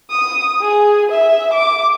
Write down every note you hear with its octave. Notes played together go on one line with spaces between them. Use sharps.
D#6
G#4
E5
D6